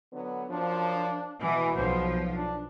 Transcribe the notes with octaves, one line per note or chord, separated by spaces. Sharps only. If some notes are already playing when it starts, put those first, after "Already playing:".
D3 F#3 B3
F#2 F3 D4
B2 E3
B1 F3 C5
D4